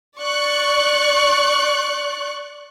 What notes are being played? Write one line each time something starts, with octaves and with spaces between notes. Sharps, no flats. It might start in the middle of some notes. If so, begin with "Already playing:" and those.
D5 C#6 F#6